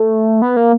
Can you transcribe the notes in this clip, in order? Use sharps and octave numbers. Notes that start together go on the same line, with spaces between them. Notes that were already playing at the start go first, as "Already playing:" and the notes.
Already playing: A3
B3
A#3